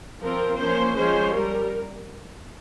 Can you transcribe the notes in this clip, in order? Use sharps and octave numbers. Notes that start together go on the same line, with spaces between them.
F3 C4 A#4
F3 A#3 C#4 C5
F3 G#3 C#4 C5
G3 A#4